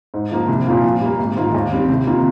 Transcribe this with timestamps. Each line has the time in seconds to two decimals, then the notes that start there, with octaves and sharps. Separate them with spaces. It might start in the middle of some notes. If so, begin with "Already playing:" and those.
0.14 G#2
0.32 F3 A#3
0.48 C2
0.66 A#2 F3 A#3 F4
0.84 A#2
1.01 G3 A#3
1.19 G#1
1.36 G#2 D#3 A#3 F4
1.54 D#2
1.72 D#3 G3 C4
1.89 C2
2.07 C3 D#3 A#3 F4